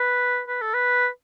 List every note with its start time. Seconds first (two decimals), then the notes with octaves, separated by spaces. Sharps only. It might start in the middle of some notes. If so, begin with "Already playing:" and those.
Already playing: B4
0.48 B4
0.62 A4
0.74 B4